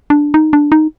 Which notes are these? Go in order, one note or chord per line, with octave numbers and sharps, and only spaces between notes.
D4
D#4
D4
D#4